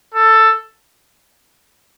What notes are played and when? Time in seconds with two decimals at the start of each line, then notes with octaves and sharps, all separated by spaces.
0.14 A4